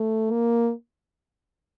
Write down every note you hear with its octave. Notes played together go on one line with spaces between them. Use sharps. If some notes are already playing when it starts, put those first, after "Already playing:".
Already playing: A3
A#3